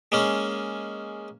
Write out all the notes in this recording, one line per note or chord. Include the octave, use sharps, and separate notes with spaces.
G#3 A#3 C#4